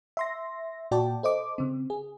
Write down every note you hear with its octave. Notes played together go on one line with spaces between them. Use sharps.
E5 C6 A#6
A#2 F#4 D5 G5 A5
A4 C5 D#5 D6
C#3 C4
G#4